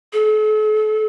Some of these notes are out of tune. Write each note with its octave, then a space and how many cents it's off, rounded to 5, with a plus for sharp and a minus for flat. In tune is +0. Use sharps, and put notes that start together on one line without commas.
A4 -40